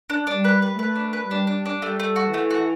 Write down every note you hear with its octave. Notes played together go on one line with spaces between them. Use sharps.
D4
G3 D4
B4
B4
A3 B4
D4
B4
G3 D4
D4
D4
G3 A3
A3
F#4
E3 A3
F#4